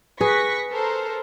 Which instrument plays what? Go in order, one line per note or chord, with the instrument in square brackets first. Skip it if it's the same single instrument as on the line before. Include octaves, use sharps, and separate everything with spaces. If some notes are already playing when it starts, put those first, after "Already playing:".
[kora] G#4 [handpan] B4 [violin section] C#6 A#6 B6
[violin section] A4 A#4 C5